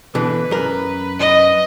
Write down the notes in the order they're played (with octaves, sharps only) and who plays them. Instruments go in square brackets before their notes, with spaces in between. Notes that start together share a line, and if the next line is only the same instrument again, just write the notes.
[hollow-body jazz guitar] B2 D3 E3 [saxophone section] B4
[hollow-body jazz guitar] F#2 A#4
[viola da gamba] D#5